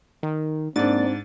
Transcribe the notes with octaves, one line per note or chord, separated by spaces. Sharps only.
D#3
G#2 A#3 C4 D4 D5 A6